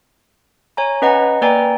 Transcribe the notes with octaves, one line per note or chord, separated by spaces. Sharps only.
C#5 G#5 A#5
C#4 B4 D#5 F#5 A#5
A#3 B4 D5 G5 G#5 A#5